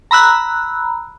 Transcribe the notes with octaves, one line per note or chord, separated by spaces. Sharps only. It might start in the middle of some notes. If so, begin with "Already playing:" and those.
A#5 B5 E6 F#6